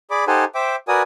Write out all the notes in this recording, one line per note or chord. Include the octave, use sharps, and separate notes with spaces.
G#4 D5 B5 D6
D#4 G4 A4 C5 F#5 G#5
C5 E5 G5 D6
F#4 A#4 B4 D5 G#5 D#6